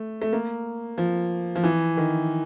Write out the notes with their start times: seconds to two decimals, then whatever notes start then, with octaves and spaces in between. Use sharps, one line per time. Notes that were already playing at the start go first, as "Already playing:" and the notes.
Already playing: A3
0.22 A3
0.33 A#3
0.98 F3
1.56 F3
1.64 E3
1.97 D#3